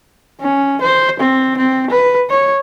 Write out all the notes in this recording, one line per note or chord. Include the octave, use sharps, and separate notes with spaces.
C#4
C5
C4
C4
B4
C#5